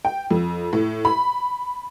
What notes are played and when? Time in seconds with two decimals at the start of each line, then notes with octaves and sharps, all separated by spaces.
0.05 G5
0.31 F2
0.73 A2
1.05 B5